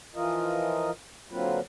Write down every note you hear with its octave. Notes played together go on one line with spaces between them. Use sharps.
E3 F3 F4 A#4 D#5
D3 F#3 A#3 C4 F4 B4